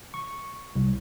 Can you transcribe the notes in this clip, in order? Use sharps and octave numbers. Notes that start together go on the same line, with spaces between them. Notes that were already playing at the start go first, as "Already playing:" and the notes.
C#6
C2